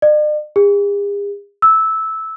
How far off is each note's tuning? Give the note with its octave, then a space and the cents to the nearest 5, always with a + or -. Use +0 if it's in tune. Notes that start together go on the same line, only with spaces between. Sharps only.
D5 +45
G#4 -45
E6 -10